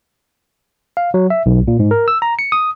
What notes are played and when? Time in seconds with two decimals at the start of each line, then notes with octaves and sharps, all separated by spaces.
0.97 F5
1.14 F#3
1.30 E5
1.46 B1
1.68 A#2
1.80 G#2
1.91 A#4
2.08 E6
2.22 A#5
2.39 C#7
2.52 D#6